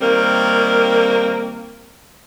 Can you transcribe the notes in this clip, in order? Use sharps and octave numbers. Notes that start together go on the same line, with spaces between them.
D#3 G3 A#3 C4 A#4